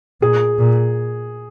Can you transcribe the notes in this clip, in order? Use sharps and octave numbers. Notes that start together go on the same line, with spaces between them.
A#2 G#4
A#2